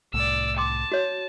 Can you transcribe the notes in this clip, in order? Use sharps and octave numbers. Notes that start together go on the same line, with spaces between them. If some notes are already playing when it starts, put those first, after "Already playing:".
C2 A2 D5 E6
G5 A5 C6 D6
F#4 C#5